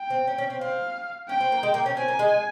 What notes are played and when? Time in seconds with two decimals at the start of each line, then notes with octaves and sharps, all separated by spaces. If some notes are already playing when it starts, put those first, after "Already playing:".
Already playing: G5
0.10 C4
0.27 C#4
0.38 C#4
0.50 C4
0.61 C4 F5
1.29 C#4 G5
1.41 C4
1.52 A#3
1.63 G#3
1.74 A#3
1.86 C#4
1.97 C4 G#5
2.08 A#3
2.19 G#3